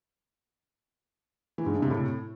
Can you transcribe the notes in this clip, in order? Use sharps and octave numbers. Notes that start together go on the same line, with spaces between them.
E3
G#2
G2
C3
A2